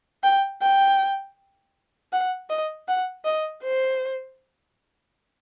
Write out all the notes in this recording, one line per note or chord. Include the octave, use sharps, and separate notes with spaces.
G5
G5
F#5
D#5
F#5
D#5
C5